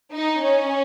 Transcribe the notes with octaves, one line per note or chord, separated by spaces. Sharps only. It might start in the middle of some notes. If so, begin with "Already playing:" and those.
D#4
C#4